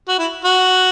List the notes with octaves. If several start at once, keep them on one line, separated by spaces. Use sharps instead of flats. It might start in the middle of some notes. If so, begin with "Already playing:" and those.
F#4
E4
F#4